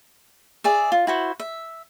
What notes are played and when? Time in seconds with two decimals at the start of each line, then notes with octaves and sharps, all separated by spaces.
0.64 G#4 D5 E5
0.92 F4
1.07 E4 F#4 C5
1.40 E5